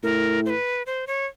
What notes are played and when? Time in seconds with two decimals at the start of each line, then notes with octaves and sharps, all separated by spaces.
0.03 A2 A#4
0.46 C5
0.50 B4
0.86 C5
1.07 C#5